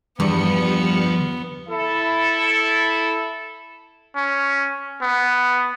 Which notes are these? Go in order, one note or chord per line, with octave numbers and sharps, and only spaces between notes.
E2 G2 F3 G3 B3 C#7
E4 A4
C#4
B3